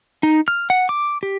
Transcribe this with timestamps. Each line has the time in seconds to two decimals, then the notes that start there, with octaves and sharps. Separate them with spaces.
0.23 D#4
0.48 F6
0.70 F#5
0.89 D6
1.23 G4